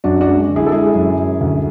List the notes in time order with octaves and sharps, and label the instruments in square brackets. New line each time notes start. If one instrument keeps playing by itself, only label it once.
[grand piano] F#2 D4 F#4
D4 F#4
G#3
D3
E4 G#4
A4
G#3 E4 G#4
F#2
F#2
D2